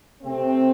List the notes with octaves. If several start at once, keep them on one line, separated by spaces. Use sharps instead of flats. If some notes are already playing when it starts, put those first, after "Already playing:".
C3 A3 C4